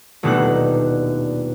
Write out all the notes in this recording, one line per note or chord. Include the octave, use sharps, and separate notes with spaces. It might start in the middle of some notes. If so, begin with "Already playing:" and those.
D#1 B2 A3 D4 D#4 F#6